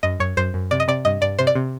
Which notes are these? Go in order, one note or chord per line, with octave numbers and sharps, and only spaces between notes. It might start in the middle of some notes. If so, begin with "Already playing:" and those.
F#2 D#5
F#2 C#5
F#2 C5
F#2
C3 D5
D#5
C3 D5
G2 D#5
G2 D5
C3 C5
D5
C3